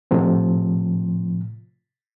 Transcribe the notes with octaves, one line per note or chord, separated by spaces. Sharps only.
A2 C3 F3